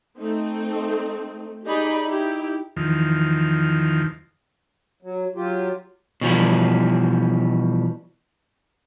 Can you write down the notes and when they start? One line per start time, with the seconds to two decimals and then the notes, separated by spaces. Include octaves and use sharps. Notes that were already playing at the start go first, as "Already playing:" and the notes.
0.17 A3 C4 D#4
1.64 D#4 G4 G#4 D5 D#5 B5
2.03 D#4 E4 G4
2.77 E2 D#3 F3
5.02 F#3
5.35 F#3 F4 G4
6.21 B2 E3 F3 G3